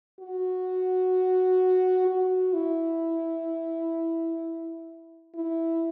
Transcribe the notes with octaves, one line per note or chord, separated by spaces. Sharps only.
F#4
F#4
E4
E4